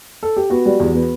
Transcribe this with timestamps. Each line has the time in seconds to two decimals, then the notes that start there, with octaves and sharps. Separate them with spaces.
0.23 A4
0.37 G4
0.50 B3 F#4
0.66 G3
0.80 E2
0.95 B3